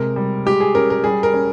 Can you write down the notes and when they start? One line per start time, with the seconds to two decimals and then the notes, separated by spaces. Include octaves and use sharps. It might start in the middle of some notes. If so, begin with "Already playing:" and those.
Already playing: C3 G#3 A#4
0.16 G3
0.46 G#3 G4
0.60 G#4
0.75 C#4 A#4
0.90 A#4
1.04 G3 G#4
1.23 A#4
1.34 C#4